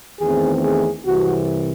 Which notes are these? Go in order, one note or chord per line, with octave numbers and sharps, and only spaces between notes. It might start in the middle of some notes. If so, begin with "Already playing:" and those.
E2 D#3 A3 C4 G#4
G#4
C2 C3 E3 F#4